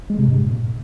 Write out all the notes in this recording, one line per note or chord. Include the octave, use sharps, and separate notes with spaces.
G#3
C3
G2
A#2